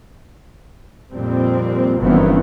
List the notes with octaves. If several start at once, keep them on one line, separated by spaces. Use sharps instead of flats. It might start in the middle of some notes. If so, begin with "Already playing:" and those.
F2 A#2 G3 C4
G1 F#2 D#3 E3 B3 C4